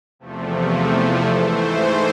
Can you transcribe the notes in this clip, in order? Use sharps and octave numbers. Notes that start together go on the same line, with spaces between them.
E2 C3 F3 A3
G#2 E3 A3 C5